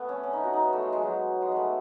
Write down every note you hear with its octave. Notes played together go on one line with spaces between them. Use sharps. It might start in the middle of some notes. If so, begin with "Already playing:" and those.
Already playing: A3 B3
C#4
C#4
D#4
F#4
D#4
B3
A3
G#3
G#3
F#3
G#3
A3 B3